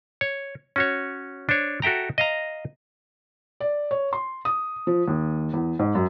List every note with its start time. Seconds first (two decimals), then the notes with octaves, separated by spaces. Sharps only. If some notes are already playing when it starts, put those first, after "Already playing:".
0.21 C#5
0.76 C#4 F#4 C#5
1.49 D4 C5 C#5
1.82 F#4 A4 E5 G5 A#5
2.18 D#5 F5 A#5
3.60 D5
3.91 C#5
4.13 C6
4.45 D#6
4.87 F3
5.08 D#2
5.54 E2
5.79 G#2
5.95 F#2